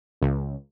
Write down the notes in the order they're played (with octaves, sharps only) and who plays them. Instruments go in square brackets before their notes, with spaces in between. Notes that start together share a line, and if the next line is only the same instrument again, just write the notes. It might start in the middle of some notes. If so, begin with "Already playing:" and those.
[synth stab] C#2